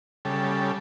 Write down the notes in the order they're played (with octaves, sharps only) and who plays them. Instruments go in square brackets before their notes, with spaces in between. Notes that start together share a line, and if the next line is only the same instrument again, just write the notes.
[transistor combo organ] C#3 G3 A4